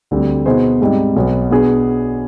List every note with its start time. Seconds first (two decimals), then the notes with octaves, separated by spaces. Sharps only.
0.11 D2 D3 G3 C4
0.46 B2 B3 D#4 G#4 C5
0.81 G#2 G3 C4 D#4
1.16 B1 B2 B3
1.51 B2 B3 D4 G#4